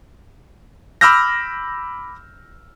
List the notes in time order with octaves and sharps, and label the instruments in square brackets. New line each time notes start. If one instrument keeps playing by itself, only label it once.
[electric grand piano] B5 D6 E6 F6 G6 A#6